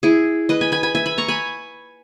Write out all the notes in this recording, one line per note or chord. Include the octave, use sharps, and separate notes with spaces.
E4 G#4
B4 D#5
G#5 B5
G#5 B5
G#5 B5
E5 G#5
G#5 B5
A#5 C#6
G#5 B5